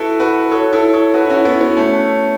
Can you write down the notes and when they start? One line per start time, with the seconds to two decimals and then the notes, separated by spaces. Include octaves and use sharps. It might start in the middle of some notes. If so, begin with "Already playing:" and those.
Already playing: E4 F#4 A4 B4
0.20 F#4 B4
0.51 A4 C#5
0.72 E4 A4
0.93 A4 C#5
1.14 F#4 B4
1.25 E4
1.30 C#4 F#4
1.45 B3 E4
1.61 B3
1.77 A3 C#4